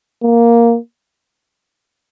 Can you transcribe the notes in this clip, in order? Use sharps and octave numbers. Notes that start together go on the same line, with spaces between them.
A#3